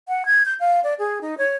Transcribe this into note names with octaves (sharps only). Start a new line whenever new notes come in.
F#5
G#6
G6
F5
D5
G#4
D#4
C#5